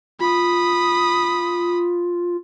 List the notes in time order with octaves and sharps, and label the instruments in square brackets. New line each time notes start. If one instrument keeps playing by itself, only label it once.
[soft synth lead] F4 [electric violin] B5 D#6